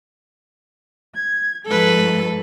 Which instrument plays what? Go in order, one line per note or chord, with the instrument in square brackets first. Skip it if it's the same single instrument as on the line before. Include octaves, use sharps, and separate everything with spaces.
[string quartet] G#6
[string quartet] G#2 F3 [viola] A4 B4